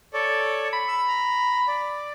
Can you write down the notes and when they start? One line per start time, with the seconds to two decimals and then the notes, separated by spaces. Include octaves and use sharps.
0.13 A4 C#5 D5
0.73 B5
0.88 E6
1.08 A#5
1.67 D5